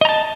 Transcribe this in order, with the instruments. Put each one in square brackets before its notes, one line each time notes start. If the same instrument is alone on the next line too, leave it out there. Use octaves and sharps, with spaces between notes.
[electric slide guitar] D#5
A#5
A5